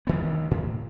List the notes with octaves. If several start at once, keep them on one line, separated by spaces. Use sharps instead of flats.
D2 D#3 B3
A2